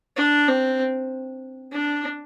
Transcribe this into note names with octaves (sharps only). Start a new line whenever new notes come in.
D4
C4
D4